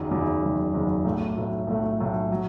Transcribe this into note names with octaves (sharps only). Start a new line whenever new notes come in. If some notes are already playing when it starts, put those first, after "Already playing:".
Already playing: F#1 E2 D#3 F#3
F#1 E2 D#3 F#3
F#1 E2 D#3 F#3
F#1 E2 D#3 F#3
B1 A2 F#3 A3
B1 A2 F#3 A3
B1 A2 F#3 A3
B1 A2 F#3 A3
F#3